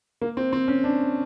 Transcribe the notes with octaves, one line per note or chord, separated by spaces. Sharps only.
A#3
C4
C4
C#4
D4